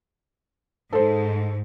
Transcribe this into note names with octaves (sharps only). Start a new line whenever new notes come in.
G#2 A4 C5